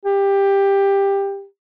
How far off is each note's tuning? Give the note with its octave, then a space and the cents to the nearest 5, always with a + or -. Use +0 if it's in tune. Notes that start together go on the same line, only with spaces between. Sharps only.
G4 +15